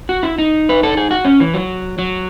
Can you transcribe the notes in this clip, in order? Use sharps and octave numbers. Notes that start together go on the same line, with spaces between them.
F#4
E4
D#4
B4
A4
G#4
F#4
C#4
E3
F#3
F#3